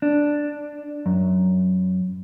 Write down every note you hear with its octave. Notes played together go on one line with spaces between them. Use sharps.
D4
F#2